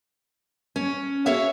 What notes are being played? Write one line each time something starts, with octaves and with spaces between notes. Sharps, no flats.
C#4
F#4 G#4 C#5 E5 F5